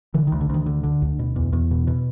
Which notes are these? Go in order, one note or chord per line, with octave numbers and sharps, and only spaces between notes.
D3 E3
D#3
D2
D3
D2 D#3
D3
D3
D2
B2
E2
E2
B2
B2